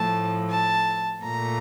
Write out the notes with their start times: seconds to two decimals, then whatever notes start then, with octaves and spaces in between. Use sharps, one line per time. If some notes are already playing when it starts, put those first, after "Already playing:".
Already playing: A2 F3 A3 A5
0.49 A5
1.23 A#2 A3 A#5